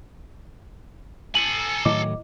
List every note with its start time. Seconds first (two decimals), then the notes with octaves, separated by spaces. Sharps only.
1.35 A4 G#5 F#7
1.85 A2 D#3 F#3 E4 D#5 D6